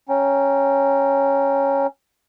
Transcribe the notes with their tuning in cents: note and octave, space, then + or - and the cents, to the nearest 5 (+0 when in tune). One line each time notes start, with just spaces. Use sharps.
C#4 +0 G5 +0 A#5 +0